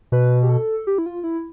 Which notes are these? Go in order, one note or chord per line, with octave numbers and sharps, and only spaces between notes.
B2 B4
G4
A4
G4
E4
F4
E4